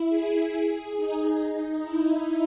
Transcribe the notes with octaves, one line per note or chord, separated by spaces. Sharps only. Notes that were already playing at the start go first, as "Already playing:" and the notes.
Already playing: E4
G#4
D#4
E4